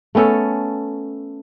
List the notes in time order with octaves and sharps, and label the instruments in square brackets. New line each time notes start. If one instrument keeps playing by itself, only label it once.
[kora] A3 B3 C#4 A4